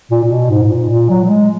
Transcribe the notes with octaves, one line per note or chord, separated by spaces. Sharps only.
A#2
A#2
B2
G#2
G#2
A#2
A#2
F#3
F#3
G#3